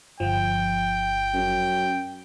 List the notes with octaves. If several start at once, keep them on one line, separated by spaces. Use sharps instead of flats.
G1 F3 G5
F#2